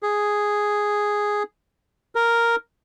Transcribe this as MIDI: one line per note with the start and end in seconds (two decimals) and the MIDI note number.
0.03 1.43 68
2.15 2.56 70